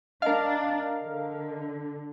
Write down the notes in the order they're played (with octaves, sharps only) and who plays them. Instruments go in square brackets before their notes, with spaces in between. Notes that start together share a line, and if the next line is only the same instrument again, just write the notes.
[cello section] D4 [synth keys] A#4 F5 [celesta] D#5
[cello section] D3